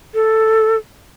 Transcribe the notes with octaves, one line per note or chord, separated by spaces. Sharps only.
A4